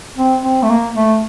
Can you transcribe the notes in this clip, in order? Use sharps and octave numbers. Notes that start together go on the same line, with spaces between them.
C4
C4
A3
A#3
A3